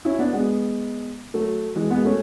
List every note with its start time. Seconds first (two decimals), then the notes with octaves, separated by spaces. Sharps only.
0.05 C#4 E4
0.19 B3 D4
0.33 G#3 B3
1.34 F#3 A3
1.76 E3 G#3
1.90 G#3 B3
2.05 A3 C#4